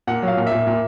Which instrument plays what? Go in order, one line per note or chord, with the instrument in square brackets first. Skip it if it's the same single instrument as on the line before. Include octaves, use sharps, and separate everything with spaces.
[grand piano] A#2 F#5
F#3
F5
A#2
E5
A#2
A#2